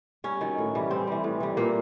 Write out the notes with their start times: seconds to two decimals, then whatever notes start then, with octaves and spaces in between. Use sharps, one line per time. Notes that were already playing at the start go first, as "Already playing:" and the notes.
0.24 G2 C#4
0.41 D#3 F#3
0.58 A2
0.75 E3 G3
0.91 G2 C4
1.07 E3 G3
1.24 A2
1.40 E3 G3
1.57 A#2 A#3